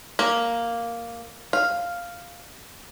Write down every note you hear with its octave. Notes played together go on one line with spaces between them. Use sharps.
A#3
F5